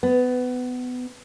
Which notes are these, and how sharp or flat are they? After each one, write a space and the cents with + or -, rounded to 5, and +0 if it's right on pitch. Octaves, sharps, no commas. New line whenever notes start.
B3 +20